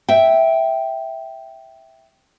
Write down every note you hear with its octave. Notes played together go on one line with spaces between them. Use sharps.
E5 G5